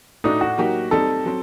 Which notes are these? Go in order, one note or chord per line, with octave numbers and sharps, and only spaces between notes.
A2 A3 D4 D#4 F#4
F#4
F#3 A#3 D#4 G4
G3 C4 D#4 A4
F#3 C4